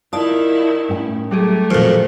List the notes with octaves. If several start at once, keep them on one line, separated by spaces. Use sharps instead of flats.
D#3 E4 F4 D5 A5 D#6
A2 C#4 G5
F#3 G3 A3 G4 G#4
F2 A#2 F#3 F#4 A#4 C5 F6